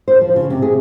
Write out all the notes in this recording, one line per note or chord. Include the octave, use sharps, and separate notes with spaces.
C5
F3
C#3
C3
G#4